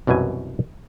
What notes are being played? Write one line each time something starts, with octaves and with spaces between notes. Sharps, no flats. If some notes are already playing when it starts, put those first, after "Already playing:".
C2 F#2 B2 E3 G#5